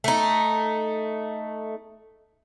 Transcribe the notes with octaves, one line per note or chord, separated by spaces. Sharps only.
A3 D#4